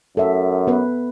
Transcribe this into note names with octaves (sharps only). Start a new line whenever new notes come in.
F#2 A4 E5
B3 B4